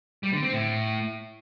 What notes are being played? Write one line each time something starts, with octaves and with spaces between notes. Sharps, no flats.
G3
D3
C4
A2